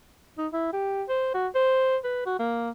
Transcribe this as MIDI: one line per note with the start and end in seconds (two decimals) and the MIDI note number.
0.38 0.47 63
0.53 0.69 64
0.73 1.03 67
1.09 1.31 72
1.34 1.48 66
1.55 1.97 72
2.04 2.26 71
2.26 2.36 66
2.39 2.71 58